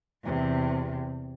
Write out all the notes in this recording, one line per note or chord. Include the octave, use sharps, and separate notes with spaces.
E2 C3